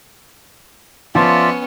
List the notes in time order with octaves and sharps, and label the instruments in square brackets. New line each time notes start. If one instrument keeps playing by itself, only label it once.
[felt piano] F3 [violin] B3 C#4 [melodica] F4 D5 E5